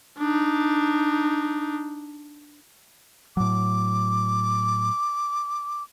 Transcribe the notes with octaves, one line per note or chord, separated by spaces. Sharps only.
D4 D#4
A2 F#3 D6